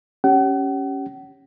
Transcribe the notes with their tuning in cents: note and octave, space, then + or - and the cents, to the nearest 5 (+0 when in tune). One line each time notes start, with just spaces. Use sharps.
C#4 +0 G4 -10 F#5 +40